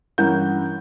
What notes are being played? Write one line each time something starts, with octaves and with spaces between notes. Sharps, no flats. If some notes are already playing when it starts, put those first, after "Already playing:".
G2 E3 C#4 A#4 F#5 G6